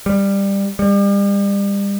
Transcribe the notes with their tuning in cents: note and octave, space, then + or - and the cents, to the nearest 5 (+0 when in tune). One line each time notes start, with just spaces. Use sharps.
G3 +15
G3 +35